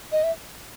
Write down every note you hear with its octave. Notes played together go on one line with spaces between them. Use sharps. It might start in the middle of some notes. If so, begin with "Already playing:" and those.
D#5
E5